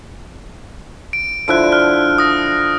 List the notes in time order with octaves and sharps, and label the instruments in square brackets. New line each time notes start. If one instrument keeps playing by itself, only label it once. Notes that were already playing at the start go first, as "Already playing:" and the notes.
[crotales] D7
[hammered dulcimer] D3 F3 E4 [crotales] F#6 D7
[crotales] F6 F#6
D#6 A#6